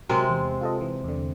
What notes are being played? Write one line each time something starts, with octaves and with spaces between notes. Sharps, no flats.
C3 F#3 G#3 C4 A#4 E5
E2
F4 A4 D#5
E3
E2 D3